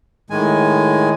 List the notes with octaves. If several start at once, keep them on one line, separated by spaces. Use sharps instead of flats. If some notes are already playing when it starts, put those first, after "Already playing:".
A2 D#3 G#3 G#5